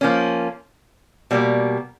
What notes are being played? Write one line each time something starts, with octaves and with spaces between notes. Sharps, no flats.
F3 A#3 C#4
B2 G3 A#3